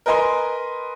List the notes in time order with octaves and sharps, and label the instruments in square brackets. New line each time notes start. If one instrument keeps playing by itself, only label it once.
[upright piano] A#4 B4 D#5 G#5 C6